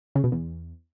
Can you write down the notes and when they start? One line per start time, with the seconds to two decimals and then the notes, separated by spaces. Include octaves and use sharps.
0.15 C#3
0.24 B2
0.32 E2